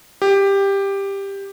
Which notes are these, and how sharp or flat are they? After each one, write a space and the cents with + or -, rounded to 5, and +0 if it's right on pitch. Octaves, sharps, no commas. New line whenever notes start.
G4 +10